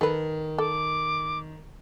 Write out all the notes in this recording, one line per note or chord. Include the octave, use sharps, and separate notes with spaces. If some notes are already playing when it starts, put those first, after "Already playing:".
D#3 A4 B4
A4 D6